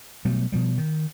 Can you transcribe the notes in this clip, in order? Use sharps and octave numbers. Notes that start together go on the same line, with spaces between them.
B2 F#3 G3 A3
B2 F3 G3
D#3